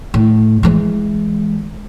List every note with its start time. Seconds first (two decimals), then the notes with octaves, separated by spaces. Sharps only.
0.14 A2
0.63 E3 G#3